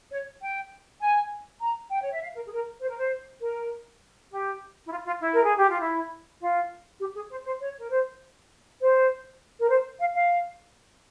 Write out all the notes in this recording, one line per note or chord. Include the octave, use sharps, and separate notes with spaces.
C#5
G5
G#5
A#5
G5
C#5
E5
F5
A#4
G#4
A#4
C5
A#4
C5
A#4
G4
E4
F4
F4
E4
A#4
G#4
G4
F4
E4
F4
G4
G#4
C5
C5
C#5
A#4
C5
C5
A#4
C5
F5
F5